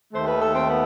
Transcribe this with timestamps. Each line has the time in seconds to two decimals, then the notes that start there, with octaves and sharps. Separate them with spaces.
0.13 D#2 D#3 A3 C5
0.26 B4
0.40 A4
0.55 C4
0.68 B3